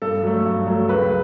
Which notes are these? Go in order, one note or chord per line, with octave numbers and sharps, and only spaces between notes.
G2 A4
F#3 A3
G2
F#3 A3
C#2 B4